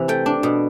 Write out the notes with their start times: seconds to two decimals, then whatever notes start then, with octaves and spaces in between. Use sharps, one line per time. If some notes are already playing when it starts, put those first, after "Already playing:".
Already playing: C3 E3 E5
0.08 A3 G5
0.26 D4
0.43 B2